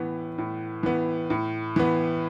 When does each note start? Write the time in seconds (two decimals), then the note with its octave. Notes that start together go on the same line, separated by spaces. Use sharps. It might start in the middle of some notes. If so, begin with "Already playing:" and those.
Already playing: A2 E3 B3
0.38 A2
0.83 E3 B3
1.30 A2
1.76 E3 B3